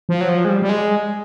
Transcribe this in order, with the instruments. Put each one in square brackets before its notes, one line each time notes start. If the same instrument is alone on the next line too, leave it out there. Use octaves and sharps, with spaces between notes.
[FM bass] F3
F#3
F3
G#3
G3
G3
G#3